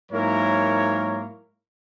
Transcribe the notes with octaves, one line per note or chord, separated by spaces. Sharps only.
G#2 F#3 A#3 E4 A#4 C#5